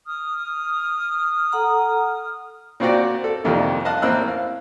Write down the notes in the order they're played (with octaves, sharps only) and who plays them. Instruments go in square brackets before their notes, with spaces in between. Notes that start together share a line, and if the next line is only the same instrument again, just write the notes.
[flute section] D#6 F6
[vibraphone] A4 F#5 A#5
[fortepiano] A#2 C4 F4 F#4 D5 G5
A4
C2 F2 A#2 D#3 G3 F4
D#5 F5 A5 F#6
A1 A#3 C4 E6 F#6
F5